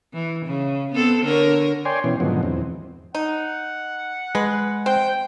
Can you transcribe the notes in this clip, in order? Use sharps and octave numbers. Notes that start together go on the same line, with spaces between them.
E3
C#3
B3 C4 A4
D3 A#4 C#5
C#5 D5 G5 G#5 C6
B2 E3 C#4
G#2 B2 D3 D#3 F3 F#3
E2 C4
D#4 F#5
G#3 B4
C4 G5